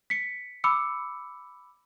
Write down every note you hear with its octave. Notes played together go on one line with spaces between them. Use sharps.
B6 C#7
B5 D6 E6 C#7